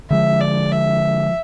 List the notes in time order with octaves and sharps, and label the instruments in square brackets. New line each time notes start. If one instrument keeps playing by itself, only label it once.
[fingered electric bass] D3 F3 G#3 [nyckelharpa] E5
[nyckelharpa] D5
E5